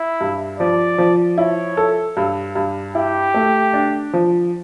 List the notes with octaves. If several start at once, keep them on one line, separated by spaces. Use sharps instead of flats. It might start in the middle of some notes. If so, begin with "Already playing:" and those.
Already playing: E4
G2
F3 D5
F3
E4 C#5
A4
G2
G2
E4 G4
A3
D4
F3